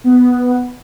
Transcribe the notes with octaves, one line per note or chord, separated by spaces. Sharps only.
B3